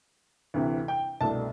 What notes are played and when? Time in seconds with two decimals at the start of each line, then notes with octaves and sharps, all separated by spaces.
0.54 D2 C3 E3
0.88 G5
1.21 C2 B2 A3 D4 A5